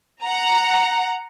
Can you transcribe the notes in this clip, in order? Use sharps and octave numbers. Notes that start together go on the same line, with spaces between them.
F#5 A#5